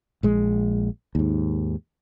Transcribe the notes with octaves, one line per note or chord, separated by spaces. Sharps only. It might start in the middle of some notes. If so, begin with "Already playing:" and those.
A#1 G#3
D#2 G#2